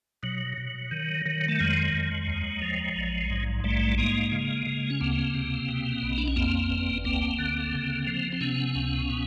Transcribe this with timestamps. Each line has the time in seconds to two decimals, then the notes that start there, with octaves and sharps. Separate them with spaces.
0.23 B2 F#3
0.58 B2
0.91 D#3
1.26 D#3
1.48 A3
1.59 F2 F#3 G#3
1.94 F2
2.27 D#2
2.62 F3
2.96 A#1
3.30 G#2
3.64 A#1 G3 A3
3.98 G#2 G#3 A#3
4.32 C#3
4.67 C#3
4.90 C#4
5.00 D2 A#3 C4
5.35 C3
5.68 B2
6.02 B1
6.18 D4
6.28 C#4
6.36 F2 A#3 C4
6.70 G1
7.05 D2 A#3 C4
7.39 D3
7.73 C#3
8.07 F3
8.32 C4
8.41 C3 B3 C#4
8.76 C#2
9.10 B2